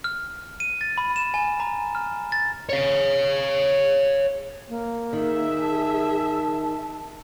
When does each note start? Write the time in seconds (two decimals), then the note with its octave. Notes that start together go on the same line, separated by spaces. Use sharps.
0.04 F6
0.60 D#7
0.81 A6
0.98 B5
1.16 E7
1.34 G#5
1.60 A#5
1.95 F6
2.32 A6
2.69 C#5 F5
4.69 A#3
5.13 D#3 G#4 E5
5.62 A5